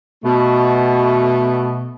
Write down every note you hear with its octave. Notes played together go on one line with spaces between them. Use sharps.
B2 A3